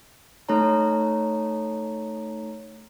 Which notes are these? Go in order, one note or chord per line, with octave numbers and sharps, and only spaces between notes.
A3 D#4 A4 C#5 A#5